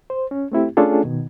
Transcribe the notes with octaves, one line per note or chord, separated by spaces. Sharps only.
C5
C#4
A3 C4 E4 G4
A3 C#4 D4 F4 G#4 A4
B2 D#3